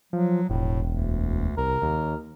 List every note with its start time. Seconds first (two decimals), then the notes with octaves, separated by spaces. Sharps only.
0.13 F3 F#3
0.50 E1 A2
0.93 D2
1.58 C2 A#4
1.82 D#2